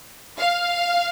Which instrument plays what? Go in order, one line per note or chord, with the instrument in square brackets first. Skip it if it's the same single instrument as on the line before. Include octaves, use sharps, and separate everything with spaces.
[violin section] F5